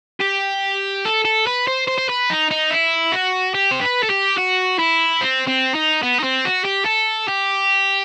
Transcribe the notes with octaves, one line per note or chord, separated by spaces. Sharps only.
G4
A4
A4
B4
C5
C5
C5
B4
D#4
D#4
E4
F#4
G4
C5
B4
A4
G4
F#4
E4
C4
C4
D#4
B3
D#4
C4
F#4
G4
A4
G4